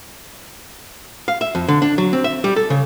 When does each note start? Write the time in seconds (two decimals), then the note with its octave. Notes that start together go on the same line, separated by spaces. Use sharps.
1.28 F5
1.41 E5
1.55 F2
1.68 D3
1.82 D4
1.98 F#3
2.13 C4
2.24 E5
2.44 G3
2.56 A4
2.70 C#3